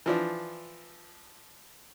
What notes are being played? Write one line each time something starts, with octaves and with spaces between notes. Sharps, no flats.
E3 F3 D4